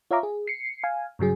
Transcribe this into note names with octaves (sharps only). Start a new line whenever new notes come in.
F4 C#5 E5 F5 A#5 D6
G#4
C7 C#7
F5 G#5
G2 C#3 F#3 G#4